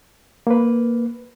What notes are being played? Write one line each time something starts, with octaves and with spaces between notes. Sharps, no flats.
A#3 B4